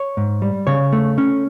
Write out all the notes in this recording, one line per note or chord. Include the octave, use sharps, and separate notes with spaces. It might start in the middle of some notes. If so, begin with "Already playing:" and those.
Already playing: C#5
G#2
G3
C#3 C#5
A3
C#4